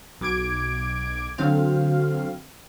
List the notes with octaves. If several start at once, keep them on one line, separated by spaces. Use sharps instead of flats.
B1 D6 G#6 D7
D3 F#3 C4 F5